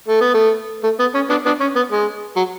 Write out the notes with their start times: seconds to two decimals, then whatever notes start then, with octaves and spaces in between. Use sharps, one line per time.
0.08 A3
0.21 B3
0.34 A3
0.84 A3
0.99 B3
1.15 C#4
1.29 B3 D4
1.45 B3 D4
1.60 C#4
1.76 B3
1.91 G#3
2.36 F#3